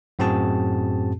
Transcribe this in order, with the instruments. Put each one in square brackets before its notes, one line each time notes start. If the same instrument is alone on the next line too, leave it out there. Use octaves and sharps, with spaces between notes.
[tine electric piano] F#2 A2 C4 F#4 G#4 A5